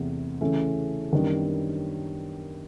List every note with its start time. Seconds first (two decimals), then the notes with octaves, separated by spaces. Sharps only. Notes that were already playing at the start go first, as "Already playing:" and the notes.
Already playing: E2 C3 E3 A3
0.41 C#3 E3 A3 C#4
1.12 F#2 D#3 G3 B3 D4